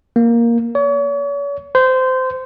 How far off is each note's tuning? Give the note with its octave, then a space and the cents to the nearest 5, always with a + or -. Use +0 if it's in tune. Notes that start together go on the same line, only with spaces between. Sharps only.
A#3 +5
C#5 +40
C5 -20